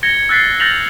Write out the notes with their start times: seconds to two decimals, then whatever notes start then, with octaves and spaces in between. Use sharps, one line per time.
0.03 G#6 A#6 C#7 G7
0.29 E6 F#6 A6 B6 C7
0.60 F6 G6 A6 A#6 F7 F#7